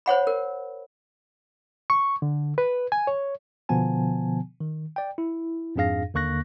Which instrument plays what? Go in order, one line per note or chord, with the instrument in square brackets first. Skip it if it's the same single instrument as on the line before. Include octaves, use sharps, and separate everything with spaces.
[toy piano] C5 C#5 F#5 B5
A#4
[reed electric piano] C#6
D3
B4
G#5
C#5
[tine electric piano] B2 D3 F3 B3 G#5 A5
D#3
D5 G5
E4
F2 G#2 D4 G#4 F5 A#6
D#2 D3 A#3 C#6 F#6 A#6